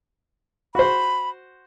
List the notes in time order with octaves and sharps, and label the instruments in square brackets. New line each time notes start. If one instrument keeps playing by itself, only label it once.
[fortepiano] F#4 C5 [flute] B5